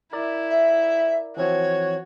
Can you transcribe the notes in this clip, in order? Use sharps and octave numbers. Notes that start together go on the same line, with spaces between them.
E4 A#4 D5
E5
E3 F3 C4 F#4 C#5